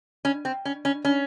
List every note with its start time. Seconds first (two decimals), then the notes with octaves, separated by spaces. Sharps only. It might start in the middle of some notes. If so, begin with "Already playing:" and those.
0.25 C#4
0.45 C4
0.65 C#4
0.85 C#4
1.05 C#4